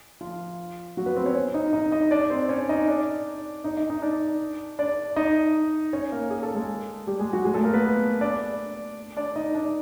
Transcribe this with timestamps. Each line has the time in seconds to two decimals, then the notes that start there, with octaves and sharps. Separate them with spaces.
0.21 F3 F4
0.97 F#3 F#4
1.06 B3 B4
1.16 C4 C5
1.26 C#4 C#5
1.54 D#4 D#5
1.73 D#4 D#5
1.92 D#4 D#5
2.11 D4 D5
2.30 C4 C5
2.49 C#4 C#5
2.69 D#4 D#5
2.88 D4 D5
3.64 D#4 D#5
3.77 D#4 D#5
3.90 D#4 D#5
4.02 D4 D5
4.79 D4 D5
5.16 D#4 D#5
5.93 C#4 C#5
6.12 A#3 A#4
6.30 G#4
6.43 A4
6.54 G#3 G#4
7.07 G3 G4
7.19 G#3 G#4
7.33 F#3 F#4
7.45 G#3 G#4
7.54 A3 A4
7.64 A#3 A#4
7.74 B3 B4
8.21 D4 D5
9.17 D4 D5
9.36 D#4 D#5
9.55 D4 D5